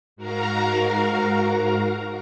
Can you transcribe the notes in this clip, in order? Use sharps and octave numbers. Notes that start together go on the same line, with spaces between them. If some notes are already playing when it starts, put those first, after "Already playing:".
G#2 F#4 A#4 F5 A#5